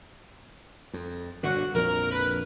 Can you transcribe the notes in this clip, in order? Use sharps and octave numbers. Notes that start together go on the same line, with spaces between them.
F2
G1 A#2 D3 F#4
A#1 F2 A#4
B4